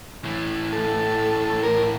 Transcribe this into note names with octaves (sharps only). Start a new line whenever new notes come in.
A2 E3
A4
A4
A#4